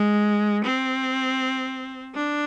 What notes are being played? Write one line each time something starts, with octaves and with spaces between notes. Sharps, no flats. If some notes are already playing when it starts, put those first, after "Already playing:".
Already playing: G#3
C4
D4